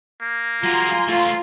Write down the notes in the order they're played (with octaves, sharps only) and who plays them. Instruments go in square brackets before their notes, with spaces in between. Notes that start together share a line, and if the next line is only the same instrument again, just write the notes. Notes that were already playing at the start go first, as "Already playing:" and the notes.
[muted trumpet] A#3
[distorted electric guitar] F#3 G#3 [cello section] F4 [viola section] G#5 A#5 C6
[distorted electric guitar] A3 C5 [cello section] F4